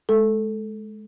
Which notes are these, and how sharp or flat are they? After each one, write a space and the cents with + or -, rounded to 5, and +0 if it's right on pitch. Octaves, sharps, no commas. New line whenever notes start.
G#3 +30 A4 +0